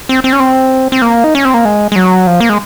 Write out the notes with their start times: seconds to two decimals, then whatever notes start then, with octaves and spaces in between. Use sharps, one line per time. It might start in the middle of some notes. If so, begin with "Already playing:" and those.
0.09 C4
0.24 C4
0.33 C#4
0.40 C4
0.92 C4
1.02 A#3
1.24 D#4
1.35 C#4
1.45 C4
1.54 A#3
1.65 G#3
1.92 G#3
1.96 F#3
2.27 F3
2.40 A#3
2.49 G#3